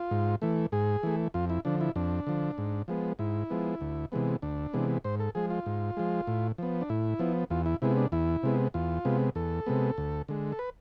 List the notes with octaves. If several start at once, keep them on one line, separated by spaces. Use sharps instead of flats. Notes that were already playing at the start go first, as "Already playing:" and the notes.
Already playing: F4
G#2
E3 A3
G#2 G#4
E3 A3
F2 F4
E4
D3 F3 D4
E4
F2 D4
D3 F3
G#2
F3 G#3 B3
G#2 E4
F3 G#3 B3
D2
C3 E3 G#3 B3
D2 D4
C3 E3 G#3 B3
G#2 C5
A4
F3 G#3 G#4
F4
G#2
F3 G#3
A2
F3 B3
D4
A2 E4
F3 B3
E2 F4
E4
C3 G#3 B3 E4
D4
E2 E4
C3 G#3 B3
E2 F4
C3 G#3 B3
E2 A4
C3 G#3 B3
D2
D3 G#3
A4
B4